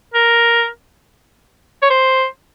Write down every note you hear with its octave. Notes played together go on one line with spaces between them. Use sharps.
A#4
C#5
C5